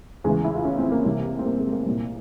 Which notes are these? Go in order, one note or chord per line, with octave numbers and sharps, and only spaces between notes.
E2 C#3 E3 G#3
E4
F4
C#4
C4
A#3
C2 C3 E3
C4
A#3
G#3
A#3
C2 A#2